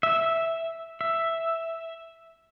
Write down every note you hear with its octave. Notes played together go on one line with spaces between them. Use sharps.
E5
E5